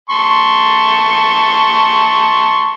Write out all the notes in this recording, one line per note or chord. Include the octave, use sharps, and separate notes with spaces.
A5 C6 C#6